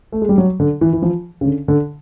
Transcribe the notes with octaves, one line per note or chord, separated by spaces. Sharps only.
A3
G#3
G3
F#3
D3
E3
E3
F3
C#3
D3
D3